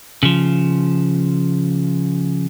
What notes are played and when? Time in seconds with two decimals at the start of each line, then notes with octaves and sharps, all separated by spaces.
0.23 C#3 F3